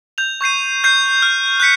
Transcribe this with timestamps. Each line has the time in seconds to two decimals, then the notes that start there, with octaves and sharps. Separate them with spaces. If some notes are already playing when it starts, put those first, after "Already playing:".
0.18 G6 F7
0.41 C#6 G6 C7 D#7
0.84 F6 G6 C7
1.22 F6
1.60 F#6 G6 B6 C#7